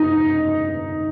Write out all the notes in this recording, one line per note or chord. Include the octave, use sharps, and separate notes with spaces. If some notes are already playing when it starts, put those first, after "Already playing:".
Already playing: D#4